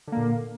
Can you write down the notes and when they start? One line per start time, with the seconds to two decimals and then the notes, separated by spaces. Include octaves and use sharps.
0.07 D3
0.12 A#3
0.17 A#2